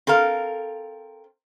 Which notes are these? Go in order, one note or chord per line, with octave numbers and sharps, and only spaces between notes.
C4 A4 A#4 F5